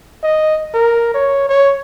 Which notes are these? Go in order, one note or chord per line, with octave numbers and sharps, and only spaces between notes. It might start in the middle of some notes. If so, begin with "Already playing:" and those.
D#5
A#4
C#5
C#5